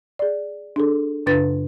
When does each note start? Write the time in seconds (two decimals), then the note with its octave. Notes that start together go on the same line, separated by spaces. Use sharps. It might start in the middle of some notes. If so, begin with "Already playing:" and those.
0.19 G#4 D5
0.76 D4 G#4 A4
1.26 F#2 C#3 D4 B4 A6